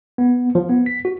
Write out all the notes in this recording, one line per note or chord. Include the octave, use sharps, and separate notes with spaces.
B3
F3
B3
B6
F#4